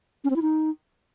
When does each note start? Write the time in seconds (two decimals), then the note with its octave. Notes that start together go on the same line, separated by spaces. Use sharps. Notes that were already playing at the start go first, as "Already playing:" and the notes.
0.24 C#4
0.30 C4
0.36 E4
0.42 D#4